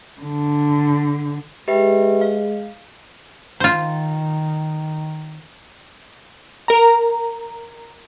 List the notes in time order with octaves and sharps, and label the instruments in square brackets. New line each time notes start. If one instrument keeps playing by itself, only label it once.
[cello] D3
[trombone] G#3 [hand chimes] G4 B4 E5
[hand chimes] F5
[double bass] D#3 [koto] F4 C5
[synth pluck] A#4 A#5